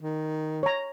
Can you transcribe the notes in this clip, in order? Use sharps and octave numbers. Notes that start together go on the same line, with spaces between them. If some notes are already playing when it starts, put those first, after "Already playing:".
D#3
C#5 A#5